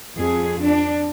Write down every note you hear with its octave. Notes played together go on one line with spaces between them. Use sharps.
F2 G#4
D4